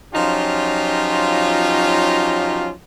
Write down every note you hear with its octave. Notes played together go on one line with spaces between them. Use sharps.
F3 F#3 C#4 D#4 F4 G4